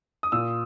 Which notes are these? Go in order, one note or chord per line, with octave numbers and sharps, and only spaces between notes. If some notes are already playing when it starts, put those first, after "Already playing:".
D#6
A#2 E6